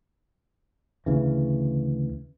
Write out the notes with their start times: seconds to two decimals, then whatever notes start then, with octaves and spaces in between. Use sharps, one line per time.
1.06 D2 C#3 E3